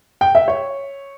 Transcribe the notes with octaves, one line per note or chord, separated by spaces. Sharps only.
G5
E5
C#5